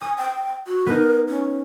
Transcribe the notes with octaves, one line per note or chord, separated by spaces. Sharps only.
G#5 D#6
G5
F#4
B3 D#4 A#4
C#4